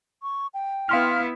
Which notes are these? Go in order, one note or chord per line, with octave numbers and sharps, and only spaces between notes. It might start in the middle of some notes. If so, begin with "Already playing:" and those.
C#6
G5
B3 E4 F5 C6 F6